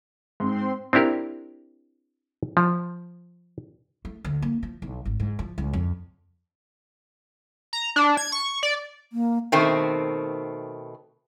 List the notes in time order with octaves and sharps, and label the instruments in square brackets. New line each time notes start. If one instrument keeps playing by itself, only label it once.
[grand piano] G#2 [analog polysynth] C4 C6
[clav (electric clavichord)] C4 D4 E4 G4 A#4
F3
[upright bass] A3
D2
A#3
F3
B1
G#1
G#2
F3
C#2
F2
[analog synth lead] A#5
D4
G#6
C#6
D5
[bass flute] A#3
[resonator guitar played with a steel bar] B2 D#3 A3 C4